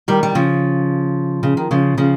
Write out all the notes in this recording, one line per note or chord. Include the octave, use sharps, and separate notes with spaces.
D#3 G3
G3
C#3 F3
C#3
D#3
C#3 F3
C#3 F3